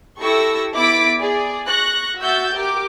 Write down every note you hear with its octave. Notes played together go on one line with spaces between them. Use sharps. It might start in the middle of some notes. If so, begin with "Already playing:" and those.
E4 G4 A4 C#6 E6 A#6
B3 E4 D6 A6 B6 D7
G#4 D5
C#6 F#6 A#6
F#4 E5 E6 G6 A6
G4 A#4 D6